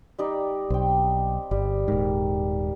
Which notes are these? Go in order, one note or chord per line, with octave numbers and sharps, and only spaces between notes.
G3 D#4 D5
B1 C4 G5
G1 G3
D#1 G#2 A#4